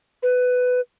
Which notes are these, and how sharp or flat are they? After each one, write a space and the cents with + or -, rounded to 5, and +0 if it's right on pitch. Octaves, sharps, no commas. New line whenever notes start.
B4 +15